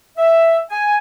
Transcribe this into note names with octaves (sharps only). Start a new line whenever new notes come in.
E5
G#5